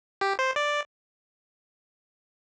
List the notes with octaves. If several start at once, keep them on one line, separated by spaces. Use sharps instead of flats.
G4
C5
D5